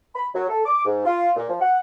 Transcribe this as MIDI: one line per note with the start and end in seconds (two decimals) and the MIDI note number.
0.15 0.27 83
0.35 0.45 54
0.49 0.64 69
0.65 0.84 86
0.85 1.03 44
1.05 1.31 65
1.35 1.48 46
1.49 1.60 53
1.61 1.79 78